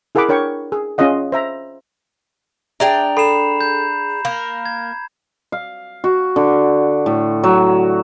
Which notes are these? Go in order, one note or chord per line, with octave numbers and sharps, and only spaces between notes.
E4 G#4 A#4 F#5 B5 D6
D4 A#4 C#5 G5 C#6
G#4
C#4 F4 G#4 D#5 F#5
C5 E5 A#5
D4 G#4 E5 G5 A#5 F7
A4 B5 C7 E7
G6
A#3 A#4 F5
G#6
F5
F#4
D3
A2
F#3